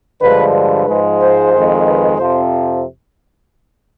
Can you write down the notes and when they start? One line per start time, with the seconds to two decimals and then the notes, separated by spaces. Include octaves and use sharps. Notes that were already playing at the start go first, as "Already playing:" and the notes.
0.21 G2 D3 F3 G#3 B4
0.54 B4
0.88 G#2 F3 G#3
1.20 C5
1.53 F2 D#3 G#3
1.85 B4
2.18 F2 C3 F3 C4 C5